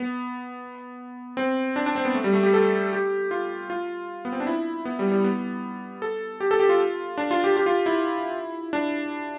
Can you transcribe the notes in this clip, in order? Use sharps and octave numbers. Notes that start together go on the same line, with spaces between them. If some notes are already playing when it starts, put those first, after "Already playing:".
Already playing: B3
C4
D4
D4
C4
B3
A3
G3
A3
G4
A4
G4
F4
F4
B3
C4
D4
E4
B3
G3
G3
B3
A4
G4
A4
G4
F4
D4
F4
G4
G4
F4
E4
D4